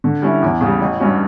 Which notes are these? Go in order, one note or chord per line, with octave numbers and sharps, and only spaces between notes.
D3
G3 C#4 E4
E2
C#3 G3
A1
G2 F#3 C#4 F#4